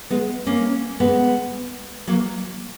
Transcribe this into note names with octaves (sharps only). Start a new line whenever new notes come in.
G#3 B3
A#3 C#4
G#3 B3
F#3 A#3